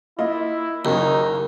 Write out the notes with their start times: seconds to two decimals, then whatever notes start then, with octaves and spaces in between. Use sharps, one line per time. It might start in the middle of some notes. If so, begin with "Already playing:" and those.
0.19 A#3 E4 F4 D#5
0.85 F#1 D#2 C#3 F#3 D#4